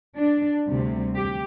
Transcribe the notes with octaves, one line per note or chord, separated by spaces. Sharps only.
D4
D2 C3 G3
G4